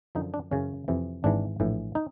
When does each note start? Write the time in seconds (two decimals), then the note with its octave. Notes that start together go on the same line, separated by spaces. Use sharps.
0.15 F#2 D3 F3 D#4
0.34 D4
0.51 F#2 C#3 E3 C#4
0.88 F2 C3 E3
1.24 G#1 G#2 E3 D4
1.60 A#1 A2 E3
1.95 D#4